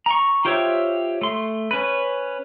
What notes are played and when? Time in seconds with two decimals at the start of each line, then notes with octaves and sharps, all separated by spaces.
0.06 A#5 C#6
0.45 F4 G4 C5 C#5 E5
1.21 A3 C6
1.71 C#4 B4